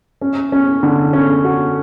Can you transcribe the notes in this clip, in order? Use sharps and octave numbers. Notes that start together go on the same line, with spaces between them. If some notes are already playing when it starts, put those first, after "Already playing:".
C#4
C#4
D3
C#4
F#4